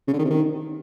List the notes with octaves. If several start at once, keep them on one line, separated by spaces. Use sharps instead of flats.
C#3
D3
D#3
C3
D#3